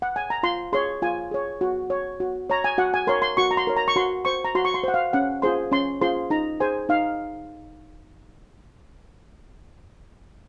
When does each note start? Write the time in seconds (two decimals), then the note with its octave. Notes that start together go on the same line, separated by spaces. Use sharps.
0.02 F#5
0.16 G#5
0.30 A#5
0.43 F4 C6
0.73 G#4 C#5 C6
1.02 F4 G#5
1.31 G#4 C#5
1.61 F#4
1.90 C#5
2.20 F#4
2.50 C#5 A#5
2.64 G#5
2.78 F#4 F#5
2.94 G#5
3.07 A#4 C#5 C6
3.22 C6
3.37 F#4 C#6
3.51 A#5
3.57 C6
3.67 A#4 C#5
3.77 A#5
3.88 C#6
3.96 F#4 C6
4.25 C5 C#6
4.44 A#5
4.55 F#4 C6
4.65 C#6
4.74 C6
4.84 C5 F#5
4.94 F5
5.13 C#4 F#5
5.42 F4 G#4 C5 C6
5.72 C#4 C6
6.01 F4 G#4 C5 C6
6.30 D#4 A#5
6.60 G#4 C5 G#5
6.89 D#4 F5